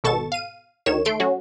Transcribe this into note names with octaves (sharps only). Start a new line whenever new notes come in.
G#1 B2 A4 C#6 A6 E7
F5 D#7
D2 D#3 C#5 E7
A3 C6 D7
F#3 C#4 F#4